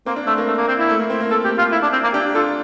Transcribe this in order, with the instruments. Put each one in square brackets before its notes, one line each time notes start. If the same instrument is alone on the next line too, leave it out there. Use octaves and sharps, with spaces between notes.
[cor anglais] A#3 [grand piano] C4
[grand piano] D4
[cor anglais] A3 [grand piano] C4
[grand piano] A#3
[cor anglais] A3
A#3
C4
E4
[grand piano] A3
A#3
C4
A#3
[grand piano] C4 [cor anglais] A4
[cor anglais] G4
F4
E4
D4
C4
A#3
[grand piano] D4 [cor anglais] G4
[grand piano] F4 [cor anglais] A4